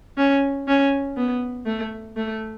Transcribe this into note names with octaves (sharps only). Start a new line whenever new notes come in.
C#4
C#4
B3
A3
A3